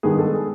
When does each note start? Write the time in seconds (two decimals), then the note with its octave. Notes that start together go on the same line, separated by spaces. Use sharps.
0.03 G2 D#3 G#3 B3 G#4
0.19 A4
0.34 G#4